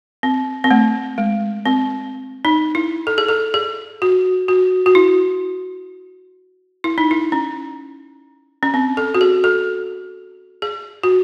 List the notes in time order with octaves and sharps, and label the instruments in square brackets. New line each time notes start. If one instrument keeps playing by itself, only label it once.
[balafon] C4
C4
A3
G#3
C4
D#4
E4
A4
G#4
A4
G#4
F#4
F#4
F#4
E4
E4
D#4
E4
C#4
C#4
C4
A4
F#4
G#4
A4
G#4
F#4